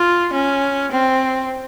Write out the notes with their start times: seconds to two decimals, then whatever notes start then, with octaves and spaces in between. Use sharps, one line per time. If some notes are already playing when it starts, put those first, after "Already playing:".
Already playing: F4
0.33 C#4
0.91 C4